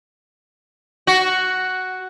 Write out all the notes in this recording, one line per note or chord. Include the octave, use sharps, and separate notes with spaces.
F#4